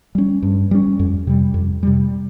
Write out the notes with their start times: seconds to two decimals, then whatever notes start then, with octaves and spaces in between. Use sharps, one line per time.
0.15 G3 C#4
0.43 G2
0.71 G3 C#4
0.99 F2
1.27 C3 G3
1.54 F2
1.83 C3 G3